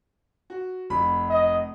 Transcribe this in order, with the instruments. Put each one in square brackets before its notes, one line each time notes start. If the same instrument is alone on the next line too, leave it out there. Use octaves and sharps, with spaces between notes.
[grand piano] F#4
F1 B5
[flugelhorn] D#5